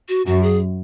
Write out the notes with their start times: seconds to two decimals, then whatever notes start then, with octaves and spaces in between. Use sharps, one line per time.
0.09 F#4
0.26 F#2 F#4
0.43 G#4